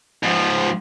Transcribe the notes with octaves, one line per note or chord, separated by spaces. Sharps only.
G#2 F3